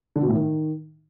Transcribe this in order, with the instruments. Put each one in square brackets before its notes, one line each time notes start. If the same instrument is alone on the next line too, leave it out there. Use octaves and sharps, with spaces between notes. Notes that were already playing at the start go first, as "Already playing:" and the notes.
[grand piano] D3
B2
A2
D#3